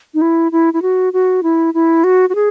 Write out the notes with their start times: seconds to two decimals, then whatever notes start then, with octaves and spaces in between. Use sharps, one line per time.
0.14 D#4
0.22 E4
0.52 E4
0.74 E4
0.82 F#4
1.13 F#4
1.43 E4
1.74 E4
2.04 F#4
2.29 F#4
2.35 G#4